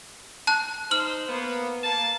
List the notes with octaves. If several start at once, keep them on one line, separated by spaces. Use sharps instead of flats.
A5 F#6
D#4 C5 F6 F#7
A#3 B3
A#3 A5